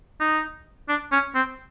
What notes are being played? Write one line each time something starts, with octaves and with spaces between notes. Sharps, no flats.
D#4
D4
C#4
C4